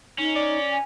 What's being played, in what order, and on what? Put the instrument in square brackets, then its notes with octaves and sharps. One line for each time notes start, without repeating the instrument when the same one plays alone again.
[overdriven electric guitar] C#4 [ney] D#4
[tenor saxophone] D5
[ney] G#5